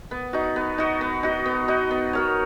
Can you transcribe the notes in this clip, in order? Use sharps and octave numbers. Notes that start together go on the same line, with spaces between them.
B3
D#4 F#4
B3
D#4 F#4
B3
D#4 F#4
B3
D#4 F#4
B3
F#4 A#4 C#5